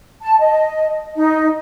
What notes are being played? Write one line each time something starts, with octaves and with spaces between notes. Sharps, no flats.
A5
D#5
D#4